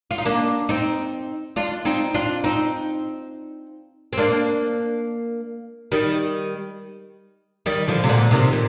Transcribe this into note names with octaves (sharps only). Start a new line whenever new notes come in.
F4
D#4
A#3 D4
C4 D#4
D4 F4
C4 D#4
D4 F4
C4 D#4
C4
A#3 D4
D#3 G3
D#3 G3
D3 F3
C3
A#2 D3
C3 D#3
A#2